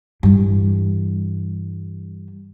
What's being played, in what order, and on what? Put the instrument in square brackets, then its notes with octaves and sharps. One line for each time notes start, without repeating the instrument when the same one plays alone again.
[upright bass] G2 E3